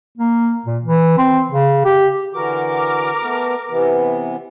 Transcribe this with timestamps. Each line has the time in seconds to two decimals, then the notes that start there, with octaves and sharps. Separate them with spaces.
0.17 A#3
0.66 A#2
0.83 E3
1.18 C4
1.51 C#3
1.85 G4
2.33 D3 E3 F#4 A#4 D6
3.22 A3 B3
3.70 C3 E3 B3